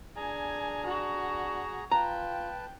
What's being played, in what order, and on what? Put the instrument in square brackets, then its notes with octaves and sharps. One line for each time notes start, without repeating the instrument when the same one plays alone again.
[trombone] D4 [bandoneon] G#4 A#5 [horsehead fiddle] G#5
[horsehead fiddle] F#4
[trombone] F4 [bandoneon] B4 A5 [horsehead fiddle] G5 [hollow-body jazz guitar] A#5